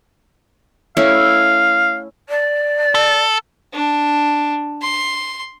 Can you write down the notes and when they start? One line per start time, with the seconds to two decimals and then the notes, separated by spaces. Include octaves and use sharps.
0.97 A3 C#4 E4 F5
2.29 D5
2.95 A4
3.73 D4
4.81 C6